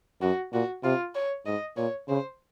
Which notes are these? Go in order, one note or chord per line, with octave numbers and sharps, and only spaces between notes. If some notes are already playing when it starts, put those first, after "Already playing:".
F#2 F#4
A#2 F#4
C3 F4
C#5
G#2 D#5
A#2 C#5
C#3 C5